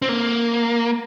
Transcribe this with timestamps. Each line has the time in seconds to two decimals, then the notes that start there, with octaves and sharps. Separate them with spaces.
0.02 C4
0.09 A#3